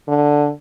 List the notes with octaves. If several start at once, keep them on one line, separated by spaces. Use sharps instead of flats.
D3